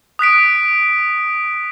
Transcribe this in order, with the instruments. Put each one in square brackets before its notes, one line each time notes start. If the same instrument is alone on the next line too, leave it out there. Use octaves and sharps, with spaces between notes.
[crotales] D#6 F#6 B6 D7